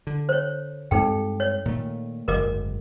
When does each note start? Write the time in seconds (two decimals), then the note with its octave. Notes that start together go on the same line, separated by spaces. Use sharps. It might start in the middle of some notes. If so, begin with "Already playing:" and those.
0.07 D3
0.29 C5 C#5
0.91 G2 G#3 C4 D#4 A4 G5
1.40 C#5
1.65 A#2 D#3 A3
2.28 F#1 D2 G#2 A#4 D#5 D6